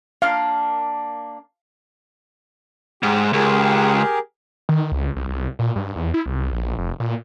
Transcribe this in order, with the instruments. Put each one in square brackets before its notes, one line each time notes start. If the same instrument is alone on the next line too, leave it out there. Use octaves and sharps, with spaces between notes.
[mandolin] A#3 D4 F6 [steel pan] F5
[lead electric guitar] G#2 [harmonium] G4
[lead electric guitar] C#2 [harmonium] G4 G#4 A#4
[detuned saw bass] D#3
C#2
C2
C2
A#2
G2
E2
E4
C2
A#1
F1
A#2